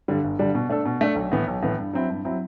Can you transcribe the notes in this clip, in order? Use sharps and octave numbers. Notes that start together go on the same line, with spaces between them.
G2 D3 G3 D4
G1
G2 D3 G3 D4
B2
A3 D4 A4
B2
A3 D4 A4
B1
A2 E3 B3
B1
A2 E3 B3
G2
F#3 C4 E4
G2
F#3 C4 E4